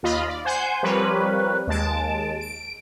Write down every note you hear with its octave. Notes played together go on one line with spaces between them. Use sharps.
D#2 F4 D#5 B5 F6
D5
C5 F#5 G#5 G6
F3 G3 C4 A#4 B4 C#5
D#2 G#3 A5 D7
D7